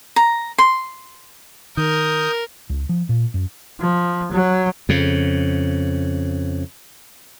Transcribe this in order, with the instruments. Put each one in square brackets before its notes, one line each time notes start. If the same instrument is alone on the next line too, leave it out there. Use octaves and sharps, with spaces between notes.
[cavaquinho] A#5
C6
[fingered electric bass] D#3 [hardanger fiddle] A#4 [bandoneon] D#6 G6
[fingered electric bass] C#2
F3
A#2
F#2
[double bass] F3
F#3
[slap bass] F2 C#3